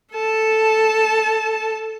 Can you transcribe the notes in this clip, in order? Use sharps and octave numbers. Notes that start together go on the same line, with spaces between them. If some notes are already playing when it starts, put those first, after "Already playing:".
A4 A5